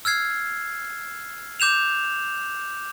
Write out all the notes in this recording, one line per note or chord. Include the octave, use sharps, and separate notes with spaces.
E6 F6 G#6 C7
D6 G6 E7 F7